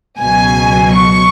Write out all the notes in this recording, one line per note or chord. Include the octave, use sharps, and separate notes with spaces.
C#2 B2 F#3 G#5
C#6